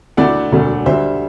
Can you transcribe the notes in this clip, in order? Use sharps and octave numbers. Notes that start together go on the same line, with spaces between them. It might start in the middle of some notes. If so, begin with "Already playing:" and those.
D2 D3 A3 E4 D5 F#5
E1 D2 D3 A3
D2 D3 G3 C5 E5